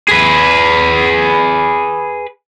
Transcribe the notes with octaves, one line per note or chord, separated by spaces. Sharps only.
G#4 B4